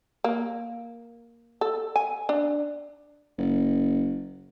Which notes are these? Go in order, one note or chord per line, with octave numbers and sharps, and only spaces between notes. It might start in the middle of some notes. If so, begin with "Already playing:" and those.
A#3
A4
G#5
D4
F#1